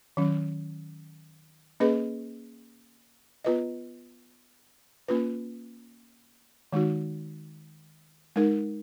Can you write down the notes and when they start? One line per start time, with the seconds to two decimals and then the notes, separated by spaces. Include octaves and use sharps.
0.17 D#3 F#3 C#4
1.80 A#3 C#4 G#4 B4 D#5
3.45 B3 F4 B4 D#5
5.08 A#3 C#4 F4 B4
6.73 D#3 G#3 D#4 F#4
8.36 G#3 D#4 A#4